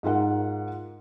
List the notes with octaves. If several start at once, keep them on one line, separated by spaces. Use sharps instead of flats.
G#2 F4 A#4 F#5